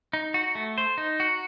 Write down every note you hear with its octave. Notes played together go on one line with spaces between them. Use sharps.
D#4
F#4
A3
C5
D#4
F#4